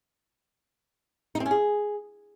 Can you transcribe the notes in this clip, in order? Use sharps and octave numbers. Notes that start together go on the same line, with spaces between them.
D#4
C4
C#4
G#4